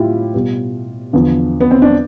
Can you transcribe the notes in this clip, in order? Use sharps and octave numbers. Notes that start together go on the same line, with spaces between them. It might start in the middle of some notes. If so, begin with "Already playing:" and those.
Already playing: A2 B3 E4 F4 G4
B2 G3 B3
E2 D3 F3 B3
B3
C4
D4